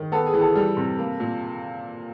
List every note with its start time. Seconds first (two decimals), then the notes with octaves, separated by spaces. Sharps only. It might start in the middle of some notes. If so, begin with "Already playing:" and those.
Already playing: D#3
0.12 B3 A4
0.27 G#4
0.34 E3
0.41 A4
0.55 G3
0.77 C3
0.99 A#3
1.20 A#2